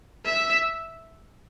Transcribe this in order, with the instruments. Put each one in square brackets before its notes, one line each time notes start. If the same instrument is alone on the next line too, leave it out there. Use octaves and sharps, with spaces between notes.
[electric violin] E5